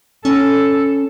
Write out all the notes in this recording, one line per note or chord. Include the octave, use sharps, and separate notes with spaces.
C#4 A4